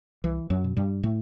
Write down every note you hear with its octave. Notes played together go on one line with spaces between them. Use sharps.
C2 E3
F#2 F#3
B2
G2 G3
A2 A3